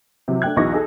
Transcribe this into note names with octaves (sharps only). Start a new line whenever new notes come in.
C3 E3 F#3
A3 D4 G5 F#6 G#6
B1 E2 E3 D#4 C#6 A#6
D#4 G#4 A4